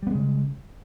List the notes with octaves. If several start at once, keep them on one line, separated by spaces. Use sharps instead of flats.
C#3 G3 G#3 B3